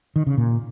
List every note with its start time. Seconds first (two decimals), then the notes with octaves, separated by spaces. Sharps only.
0.16 D#3
0.27 C#3
0.38 A#2